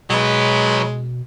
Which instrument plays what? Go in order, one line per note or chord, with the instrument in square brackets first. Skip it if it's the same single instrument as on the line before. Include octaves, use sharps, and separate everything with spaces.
[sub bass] B2 [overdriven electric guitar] F#3 B4 [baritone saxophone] G#3